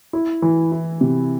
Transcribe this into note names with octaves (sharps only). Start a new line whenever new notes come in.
E4
E3
E4
C3